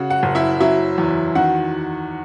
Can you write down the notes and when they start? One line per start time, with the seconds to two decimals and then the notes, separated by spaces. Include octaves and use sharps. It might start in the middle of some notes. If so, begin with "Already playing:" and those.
Already playing: C#3 F#4 F#5
0.10 F#4 F#5
0.23 F#1
0.35 E4 E5
0.60 F#3 E4 E5
0.98 E2
1.35 D#3 F#4 F#5